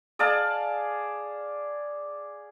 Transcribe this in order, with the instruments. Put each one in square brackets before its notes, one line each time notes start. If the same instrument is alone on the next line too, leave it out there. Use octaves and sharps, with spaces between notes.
[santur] G#4 D5 F5 A5